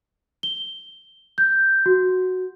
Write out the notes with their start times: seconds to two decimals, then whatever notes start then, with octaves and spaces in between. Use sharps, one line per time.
0.43 G7
1.38 G6
1.86 F#4